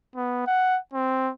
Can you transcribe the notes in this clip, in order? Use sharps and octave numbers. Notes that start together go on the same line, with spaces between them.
B3
F#5
C4